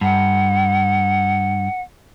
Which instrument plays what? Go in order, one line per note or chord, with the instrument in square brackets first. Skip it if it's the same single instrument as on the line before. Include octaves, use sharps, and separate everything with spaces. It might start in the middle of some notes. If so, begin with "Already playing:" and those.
[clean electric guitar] G2 [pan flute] F#5